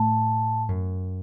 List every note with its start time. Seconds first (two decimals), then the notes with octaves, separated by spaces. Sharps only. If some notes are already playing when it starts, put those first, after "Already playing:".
Already playing: A2 A5
0.69 F#2